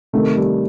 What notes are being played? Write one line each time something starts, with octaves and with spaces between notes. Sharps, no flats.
C3 D#3 A3
G3